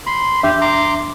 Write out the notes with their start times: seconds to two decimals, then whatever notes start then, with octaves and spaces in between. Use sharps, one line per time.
0.07 B5 C6
0.43 E2 D4 G4 E5
0.61 A#5 C6 D6